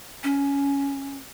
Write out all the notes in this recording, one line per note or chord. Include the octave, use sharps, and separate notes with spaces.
C#4